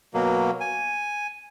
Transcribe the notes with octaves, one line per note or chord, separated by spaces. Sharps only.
B2 F#3 A#3
G#5